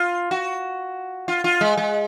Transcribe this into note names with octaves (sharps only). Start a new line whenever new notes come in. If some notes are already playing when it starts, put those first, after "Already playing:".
Already playing: F4
F#4
F4
F4
G#3
G#3